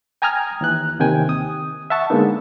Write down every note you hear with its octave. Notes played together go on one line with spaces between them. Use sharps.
G5 G#5 A#5 D#6 F6 G#6
D#2 E3 F#6
D#2 C3 D#3 G5 G#5
D#6
E5 F#5 A5 C#6
D3 G#3 A#3 B3 D#4